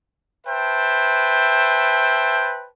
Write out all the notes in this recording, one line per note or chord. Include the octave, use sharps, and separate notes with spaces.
B4 C5 E5 G5 A5